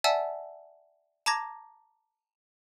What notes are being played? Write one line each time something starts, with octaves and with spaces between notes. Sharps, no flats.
D5 E5 F#5 G#5 A5 E6
A5 A#5 D6 G#6 A#6